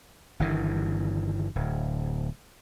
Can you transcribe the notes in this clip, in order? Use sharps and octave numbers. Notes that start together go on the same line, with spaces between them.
G1 G2 D#3 E3
D1